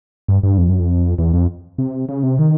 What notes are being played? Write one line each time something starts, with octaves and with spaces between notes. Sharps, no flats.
G2
G2
F2
F#2
F2
E2
F2
C3
C#3
C3
D#3